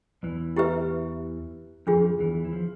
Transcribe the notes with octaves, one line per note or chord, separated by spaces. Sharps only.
E2 E3
E4 G4 B4 E5
F2 F3 D4 F4 G#4
E2 E3
E3
F3